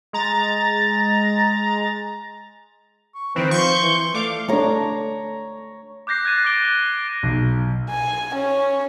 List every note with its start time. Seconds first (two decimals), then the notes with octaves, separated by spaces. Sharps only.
0.13 G#3 A#5 A6
3.15 C#6
3.36 D#3 E3 C4 B4
3.51 F3 C6 C#6 G6
3.82 E3
4.14 A3 D5 F5 D6
4.48 A3 D4 C#5 A#5
6.07 D6 F#6 G6 A#6 C7
6.25 F#6 G#6 A6 D#7
6.44 D6 G6 A6 D7 G7
7.23 B1
7.90 G#5
8.35 C#4